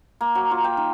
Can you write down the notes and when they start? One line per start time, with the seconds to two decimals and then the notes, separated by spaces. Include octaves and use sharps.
0.21 A#3
0.35 F#3
0.51 F4
0.64 G5
0.77 D#3